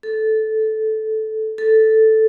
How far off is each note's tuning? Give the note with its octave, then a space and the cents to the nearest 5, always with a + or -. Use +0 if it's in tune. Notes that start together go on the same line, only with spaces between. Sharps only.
A4 -10
A4 +0